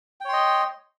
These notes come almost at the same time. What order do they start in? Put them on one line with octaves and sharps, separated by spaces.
G5 C#5 C6 D#5